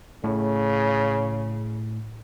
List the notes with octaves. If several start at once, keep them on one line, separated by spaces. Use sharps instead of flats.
A2 C#3